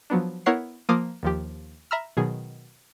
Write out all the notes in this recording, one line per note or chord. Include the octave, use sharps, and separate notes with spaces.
F3 F#3 B3 D4
B3 E4 A#4 C#5 F#5 C7
F3 A#3 F4 D6 D#6 F6
D#2 F3 G4
E5 A#5 B5 E6 F6
B2 D#3 F#3 G#4